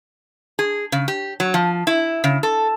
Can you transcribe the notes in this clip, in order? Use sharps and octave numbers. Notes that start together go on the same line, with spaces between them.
G#4
C#3
G4
F#3
F3
E4
C#3
A4